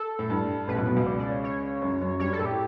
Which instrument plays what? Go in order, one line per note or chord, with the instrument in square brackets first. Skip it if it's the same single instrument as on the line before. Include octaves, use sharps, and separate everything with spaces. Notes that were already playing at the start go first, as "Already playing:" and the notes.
Already playing: [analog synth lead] A4
[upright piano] A2
G2
[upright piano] A1 A2 [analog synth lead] B4
[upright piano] B1 B2
B1 B2
C#2 C#3
[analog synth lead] D5
D5
C#5
C#5
[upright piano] F#2 F#3
F#2 F#3
[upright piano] G2 G3 [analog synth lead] C#5
[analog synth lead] A4
[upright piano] A2 A3
[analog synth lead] G4